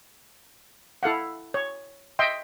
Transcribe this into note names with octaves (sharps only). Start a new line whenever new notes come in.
E4 A4 F5 F#5
C#5
D#5 E5 G5 C6